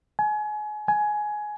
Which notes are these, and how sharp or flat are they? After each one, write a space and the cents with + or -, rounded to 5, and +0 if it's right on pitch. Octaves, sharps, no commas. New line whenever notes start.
G#5 +30
G#5 +15